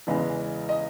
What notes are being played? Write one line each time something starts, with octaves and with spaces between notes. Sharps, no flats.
E2 C#3 E3 G#3 B4
D#5